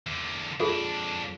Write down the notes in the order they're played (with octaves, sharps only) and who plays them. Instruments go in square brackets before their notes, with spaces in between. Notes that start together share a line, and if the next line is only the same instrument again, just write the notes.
[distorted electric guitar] E2 D3
[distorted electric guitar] F2 D4 [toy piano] F4 G#4 A4